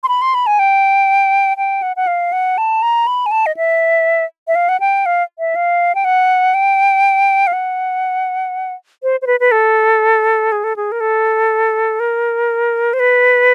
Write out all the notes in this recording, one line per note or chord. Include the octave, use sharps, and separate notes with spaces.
C6
B5
C6
B5
G#5
G5
G5
F#5
F#5
F5
F#5
A5
A#5
B5
G#5
A5
D#5
E5
E5
F5
F#5
G5
F5
E5
F5
G5
F#5
G5
F5
F#5
C5
C5
B4
B4
A4
G#4
A4
G#4
A#4
A4
A#4
C5
B4